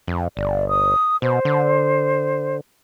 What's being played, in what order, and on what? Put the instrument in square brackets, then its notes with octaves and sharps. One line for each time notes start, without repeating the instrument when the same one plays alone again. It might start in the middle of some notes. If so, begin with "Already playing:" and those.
[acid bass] F2
[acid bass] G1 [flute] D5
[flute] D#6
[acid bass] B2 [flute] C5
[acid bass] D3